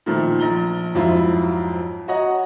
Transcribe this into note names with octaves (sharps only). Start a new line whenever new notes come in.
A#2 D#3 F3 A3
A#1 A#5 G7
F2 G#2 F#3 E4 F4
F#4 C#5 D#5 F#5 A#5